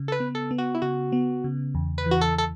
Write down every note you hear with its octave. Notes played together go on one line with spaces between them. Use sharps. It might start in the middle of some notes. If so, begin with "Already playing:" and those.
Already playing: C#3
A4
B4
B3
A4
B3
F#4
E4
C#3 F#4
B3
C#3
E2
B4
E3
F#4
A4
A4